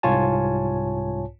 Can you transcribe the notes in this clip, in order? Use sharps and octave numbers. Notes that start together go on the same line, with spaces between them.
C2 G#2 F4 C#5 G#5 A5